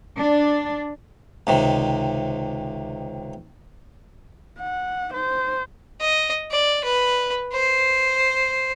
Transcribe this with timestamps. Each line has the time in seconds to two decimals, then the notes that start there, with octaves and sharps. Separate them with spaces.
0.17 D4
1.47 C#2 C3 D#3
4.60 F#5
5.13 C5
6.01 D#5
6.51 D5
6.84 B4
7.53 C5